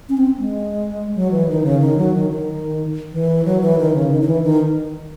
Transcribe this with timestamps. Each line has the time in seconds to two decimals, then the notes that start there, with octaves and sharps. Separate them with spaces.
0.09 C#4
0.17 C4
0.39 G#3
1.15 F#3
1.31 E3
1.48 D#3
1.64 C#3
1.81 D#3
1.98 F#3
2.14 D#3
2.30 D#3
3.12 E3
3.45 F#3
3.61 E3
3.78 D#3
3.94 C#3
4.11 D#3
4.22 D#3
4.27 E3
4.43 D#3